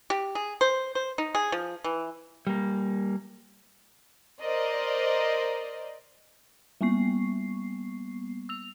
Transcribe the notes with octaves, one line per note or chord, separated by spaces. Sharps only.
G4
G#4
C5
C5
D#4
G#4
F3
E3
G3 A#3
A#4 C5 D5 D#5
G3 A#3 B3 C#6 C7
E6 F7